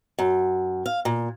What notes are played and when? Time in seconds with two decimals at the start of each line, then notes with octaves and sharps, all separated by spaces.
0.19 F#2
0.86 F5
1.05 A#2